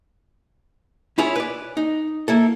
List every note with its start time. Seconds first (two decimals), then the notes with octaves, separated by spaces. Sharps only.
1.18 C#4 E4 F4 G#4 C#5
1.36 B4 D5
1.77 D#4
2.28 A#3 E4 A4